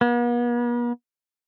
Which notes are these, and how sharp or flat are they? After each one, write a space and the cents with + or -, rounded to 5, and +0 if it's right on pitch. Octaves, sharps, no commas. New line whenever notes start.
B3 -45